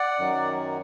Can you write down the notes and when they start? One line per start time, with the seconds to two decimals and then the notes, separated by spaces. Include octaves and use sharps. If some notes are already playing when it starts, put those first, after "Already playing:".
Already playing: D5 F#5
0.19 F#2 D#3 F#3